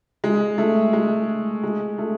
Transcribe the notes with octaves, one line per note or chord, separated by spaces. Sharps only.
G#3
A3
G#3
G#3
A3